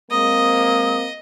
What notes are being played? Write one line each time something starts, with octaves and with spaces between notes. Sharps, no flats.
G#3 A#3 C4 D#5 D#6